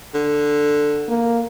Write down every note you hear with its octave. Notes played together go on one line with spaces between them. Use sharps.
D3
A#3